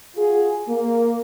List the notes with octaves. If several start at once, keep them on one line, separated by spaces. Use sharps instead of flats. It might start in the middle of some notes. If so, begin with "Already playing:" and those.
F4 F#4 G#4
A#3